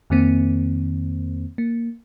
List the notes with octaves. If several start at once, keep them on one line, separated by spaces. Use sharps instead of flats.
F2 D#3 A#3 C4
A#3